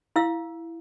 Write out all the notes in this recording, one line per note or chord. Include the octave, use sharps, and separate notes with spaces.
E4 F5 E6